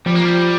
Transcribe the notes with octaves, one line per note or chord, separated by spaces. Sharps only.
F3 G3
A#3
G3